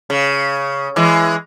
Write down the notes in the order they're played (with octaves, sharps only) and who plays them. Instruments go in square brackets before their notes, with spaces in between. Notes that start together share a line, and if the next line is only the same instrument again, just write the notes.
[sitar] C#3
E3 G#3